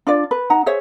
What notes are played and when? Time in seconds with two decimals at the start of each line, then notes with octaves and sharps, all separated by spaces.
0.07 D4 F4 D5
0.31 B4
0.50 D#4 F#5 A#5
0.66 G#4 C5 C#5 E5